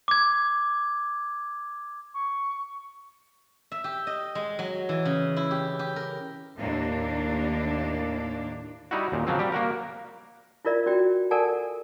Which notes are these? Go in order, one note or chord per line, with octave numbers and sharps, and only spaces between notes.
D6 G#6
C#6
E5
G4
D#5
G#3
F#3
E3
C#3
E4
G4
G4
A#4
D#2 A2 A#3 D4
G3 D#4 E4 F#4
D#2 A#2
C#3 F3 F#3 C4
G3 G4
A#3 F#4 A#4
E4 F4 A#4 D5 E5
C#4 F#4 D5 G5
A4 A#4 D5 F#5 G#5 A5